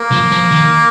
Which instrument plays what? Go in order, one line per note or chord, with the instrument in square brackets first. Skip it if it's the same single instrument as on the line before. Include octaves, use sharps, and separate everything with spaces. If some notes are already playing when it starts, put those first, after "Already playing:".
Already playing: [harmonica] A#3
[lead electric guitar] F3
F3
D#3